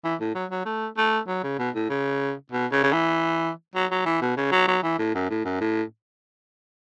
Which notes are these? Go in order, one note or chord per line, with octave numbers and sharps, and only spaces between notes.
E3
A2
F#3
F#3
A3
A3
F#3
C#3
B2
A2
C#3
B2
C#3
C#3
E3
F#3
F#3
E3
B2
C#3
F#3
F#3
E3
A2
F#2
A2
F#2
A2